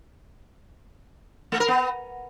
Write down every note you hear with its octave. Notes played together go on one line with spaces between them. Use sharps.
A3
A#4
B3